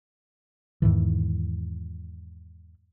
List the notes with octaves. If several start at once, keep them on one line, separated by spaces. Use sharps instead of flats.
E2 G#2 D#3 E3